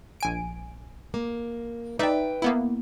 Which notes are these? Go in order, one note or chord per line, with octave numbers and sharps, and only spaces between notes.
A#1 G#5 D7
A#3
D#4 B4 D5 E5 G5
A#3 B3 E4